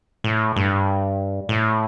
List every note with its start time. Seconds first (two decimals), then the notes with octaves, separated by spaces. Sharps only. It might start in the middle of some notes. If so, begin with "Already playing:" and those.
0.24 A2
0.56 G2
1.49 A2